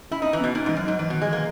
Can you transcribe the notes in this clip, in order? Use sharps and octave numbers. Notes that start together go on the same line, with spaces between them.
C#4 E4
C#4 D#4
E3
B2 B3
A#2 D#4
G#2 E3
F#2 F#3
G#2
G#2 E3
B2 D#3
G#3
E3 A#3